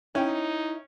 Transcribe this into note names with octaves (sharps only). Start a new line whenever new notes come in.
C#4 D#4 E4 G5